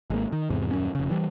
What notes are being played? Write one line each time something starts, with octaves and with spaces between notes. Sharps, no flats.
G#1 G#3 A#3
D#3
E2 G#2 C3
D#1 F#2 C#4
F1 C#3
E3 G3